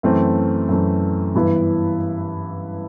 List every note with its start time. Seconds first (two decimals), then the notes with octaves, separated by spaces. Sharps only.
0.03 F#2 E3 A3 C4
0.68 F#2 E3 A3 C4
1.35 G2 E3 B3 E4